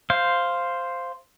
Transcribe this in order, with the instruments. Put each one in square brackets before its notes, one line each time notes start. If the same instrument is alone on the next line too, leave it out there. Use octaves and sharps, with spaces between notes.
[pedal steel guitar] C5 F5